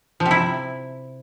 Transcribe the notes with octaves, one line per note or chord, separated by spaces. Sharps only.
F3
C3
E4